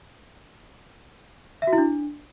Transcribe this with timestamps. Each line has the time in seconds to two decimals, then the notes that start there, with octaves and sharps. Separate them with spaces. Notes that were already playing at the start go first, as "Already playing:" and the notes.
1.62 E5
1.67 F#4
1.73 E4
1.78 D4